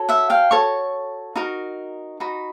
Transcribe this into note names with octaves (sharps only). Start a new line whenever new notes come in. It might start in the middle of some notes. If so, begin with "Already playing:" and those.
Already playing: F#4 A4 C#5
E5 F#5
F5 G5
F#4 A4 C#5 C#6
D#4 F#4 A#4
D#4 F#4 B5